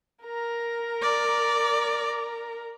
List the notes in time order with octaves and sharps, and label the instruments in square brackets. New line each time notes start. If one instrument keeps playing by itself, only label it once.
[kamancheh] A#4 A#5
[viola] D5